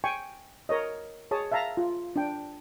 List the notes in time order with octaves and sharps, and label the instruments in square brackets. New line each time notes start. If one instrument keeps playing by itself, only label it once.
[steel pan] G5 G#5 C#6
A#4 C#5 D#5
G#4 C#5 A5 D#6
E5 F5 A5 A#5
F4
D4 G5